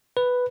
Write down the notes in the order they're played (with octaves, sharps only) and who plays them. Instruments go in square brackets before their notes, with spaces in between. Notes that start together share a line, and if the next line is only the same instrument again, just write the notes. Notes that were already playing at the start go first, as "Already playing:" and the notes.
[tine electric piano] B4